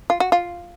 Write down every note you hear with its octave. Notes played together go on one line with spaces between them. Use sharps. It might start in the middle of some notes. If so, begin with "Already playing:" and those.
F4
F#4
F4